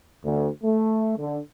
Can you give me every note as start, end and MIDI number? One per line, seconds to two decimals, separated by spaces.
0.25 0.49 38
0.63 1.14 57
1.18 1.40 50